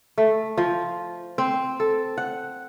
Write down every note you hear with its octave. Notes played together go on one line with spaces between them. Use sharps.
A3
F3
C4
A4
F#5